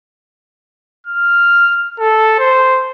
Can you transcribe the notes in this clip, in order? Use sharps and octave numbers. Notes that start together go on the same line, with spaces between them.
F6
A4
C5